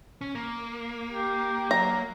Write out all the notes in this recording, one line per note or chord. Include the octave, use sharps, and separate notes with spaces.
C#4
A#3
G4
F#3 A#5